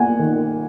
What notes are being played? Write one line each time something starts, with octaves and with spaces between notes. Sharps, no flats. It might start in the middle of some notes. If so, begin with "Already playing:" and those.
Already playing: A#3 F#5 G#5
D#3